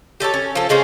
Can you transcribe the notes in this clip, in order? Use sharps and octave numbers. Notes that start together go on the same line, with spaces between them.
G4 A4 C#5 A5
C#4
F3 A4
C#3 G#3 C#4 C5